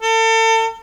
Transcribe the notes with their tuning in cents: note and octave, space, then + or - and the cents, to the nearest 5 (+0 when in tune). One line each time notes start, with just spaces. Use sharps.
A4 +40